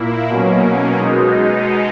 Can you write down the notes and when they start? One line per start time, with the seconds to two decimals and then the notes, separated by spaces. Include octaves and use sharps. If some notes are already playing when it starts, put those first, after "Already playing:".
Already playing: A#2 A#3 E4
0.29 B2 F#3 A#3 C#4
0.99 B2 G#3 D#4